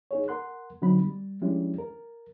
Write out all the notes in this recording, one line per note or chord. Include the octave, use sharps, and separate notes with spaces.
D#4 G#4 C#5
A#4 F#5 C6 F#6
D3 F#3 C4 D#4 B5
G3
F3 G#3 C#4 D4 E4 G4
A#4